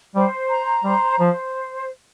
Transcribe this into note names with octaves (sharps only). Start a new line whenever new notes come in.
G3 C5
A#5
G3 C5
F3 C5